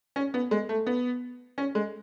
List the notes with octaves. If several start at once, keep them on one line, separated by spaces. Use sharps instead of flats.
C#4
B3
G#3
A3
B3
C#4
G#3